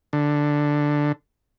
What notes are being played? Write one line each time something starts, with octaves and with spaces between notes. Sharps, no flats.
D3